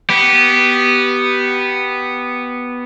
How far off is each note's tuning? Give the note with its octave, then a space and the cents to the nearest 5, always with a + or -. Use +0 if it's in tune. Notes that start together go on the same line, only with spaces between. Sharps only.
B3 -5 G4 -15